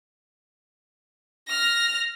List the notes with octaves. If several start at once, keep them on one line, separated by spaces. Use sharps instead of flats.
F6 A#6